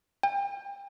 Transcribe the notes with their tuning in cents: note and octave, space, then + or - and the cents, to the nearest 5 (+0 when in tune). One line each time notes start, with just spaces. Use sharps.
G5 +35